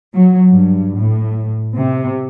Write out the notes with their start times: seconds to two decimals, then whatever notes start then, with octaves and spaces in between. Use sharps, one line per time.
0.13 F#3
0.50 G2
0.97 A2
1.76 C3